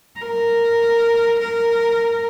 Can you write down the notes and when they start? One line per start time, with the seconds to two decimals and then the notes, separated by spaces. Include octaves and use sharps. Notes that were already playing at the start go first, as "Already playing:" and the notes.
0.19 A#4
1.42 A#4